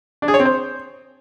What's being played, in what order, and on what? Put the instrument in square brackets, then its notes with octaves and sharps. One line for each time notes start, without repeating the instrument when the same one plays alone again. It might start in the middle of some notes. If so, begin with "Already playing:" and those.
[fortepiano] D4
G#4
C#5
C4
C5